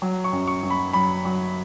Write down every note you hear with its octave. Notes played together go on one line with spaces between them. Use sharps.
F#3
C#6
F#2
C#6
F#2
B5
F#3 B5
F#3